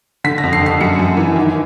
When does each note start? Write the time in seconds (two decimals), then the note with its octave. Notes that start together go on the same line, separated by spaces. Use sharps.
0.24 D3 B6
0.38 A#6
0.43 F2
0.53 C7
0.61 D3
0.66 C7
0.81 F#2 C#7
0.99 F#2
1.17 E3
1.36 D#3